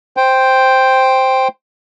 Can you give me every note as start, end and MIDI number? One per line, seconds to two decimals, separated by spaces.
0.17 1.48 72
0.17 1.48 79